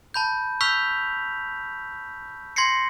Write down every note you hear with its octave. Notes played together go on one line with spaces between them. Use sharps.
A5 B5 G6
C#6 E6 F6 G6 B6 F7
C6 G#6 A#6 C7 C#7